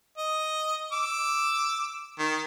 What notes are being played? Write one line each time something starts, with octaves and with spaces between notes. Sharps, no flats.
D#5
D6 E6
D#3